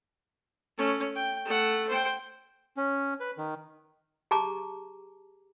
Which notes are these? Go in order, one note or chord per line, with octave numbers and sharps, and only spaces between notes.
A3 C#4
G5
A3 F#5
C5 G5
C#4
B4
D#3
G4 G#4 A5 A#5 D6